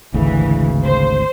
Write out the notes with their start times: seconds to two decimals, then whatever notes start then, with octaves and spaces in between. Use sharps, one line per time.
0.14 G#1 D2 C#3 E3
0.85 C5